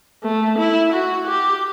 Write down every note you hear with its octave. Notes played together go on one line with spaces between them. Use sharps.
A3
E4
F#4
G4